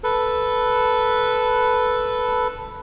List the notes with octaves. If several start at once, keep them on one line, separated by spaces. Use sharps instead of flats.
A4 B4